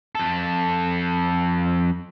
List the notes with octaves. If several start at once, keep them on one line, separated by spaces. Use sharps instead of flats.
F2 A4